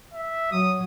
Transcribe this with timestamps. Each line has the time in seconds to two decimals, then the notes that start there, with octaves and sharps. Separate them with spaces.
0.14 E5
0.52 F#3 D#6